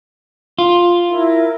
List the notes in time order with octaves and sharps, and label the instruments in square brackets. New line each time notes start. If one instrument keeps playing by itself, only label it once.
[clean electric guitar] F4
[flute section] E4 A#4